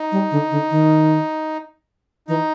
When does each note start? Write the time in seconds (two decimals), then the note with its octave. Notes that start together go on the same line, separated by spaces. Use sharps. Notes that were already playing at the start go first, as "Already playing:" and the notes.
Already playing: D#4
0.12 G3
0.31 D3
0.51 D3
0.71 D#3
2.28 E3 D#4